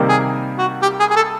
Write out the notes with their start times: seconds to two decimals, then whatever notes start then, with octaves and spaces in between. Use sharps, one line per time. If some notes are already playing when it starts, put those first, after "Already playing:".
Already playing: C3 D#3 G3 A#3
0.09 G#4
0.58 F#4
0.82 G4
1.00 G#4
1.11 G#4
1.16 A4